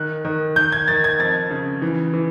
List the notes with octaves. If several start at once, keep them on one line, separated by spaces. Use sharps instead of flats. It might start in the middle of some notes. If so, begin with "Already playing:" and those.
Already playing: D#3 F#6
D#3
D#3 G6
G#6
D#3 A6
G#6
F2 A6
C#3
E3
E3